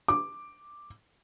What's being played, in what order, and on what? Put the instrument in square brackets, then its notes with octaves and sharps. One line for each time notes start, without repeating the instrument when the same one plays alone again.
[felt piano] D6